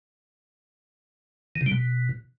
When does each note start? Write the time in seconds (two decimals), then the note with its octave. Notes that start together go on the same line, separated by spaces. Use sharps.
1.56 D#3
1.61 C3
1.66 G3
1.72 B2